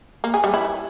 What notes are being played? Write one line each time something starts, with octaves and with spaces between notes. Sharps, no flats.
A#3
G#4
G3
E4